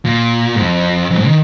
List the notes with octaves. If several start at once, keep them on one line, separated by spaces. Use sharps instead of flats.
A#2
G#2
F2
F2
G#2
D#3